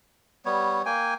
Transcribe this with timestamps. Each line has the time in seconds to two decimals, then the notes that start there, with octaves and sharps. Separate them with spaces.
0.45 G3 B3 C#5
0.86 A#3 G5 G#5